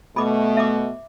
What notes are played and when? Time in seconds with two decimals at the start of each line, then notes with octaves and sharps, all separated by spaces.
0.16 B2 A3 B5 D6
0.57 E5 D6